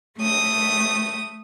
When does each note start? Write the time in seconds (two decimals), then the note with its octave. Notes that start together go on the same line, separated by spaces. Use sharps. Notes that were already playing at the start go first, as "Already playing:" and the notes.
0.18 A3 D#6